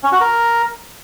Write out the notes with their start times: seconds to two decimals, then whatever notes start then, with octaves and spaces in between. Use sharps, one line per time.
0.03 C#4
0.12 F#4
0.21 A#4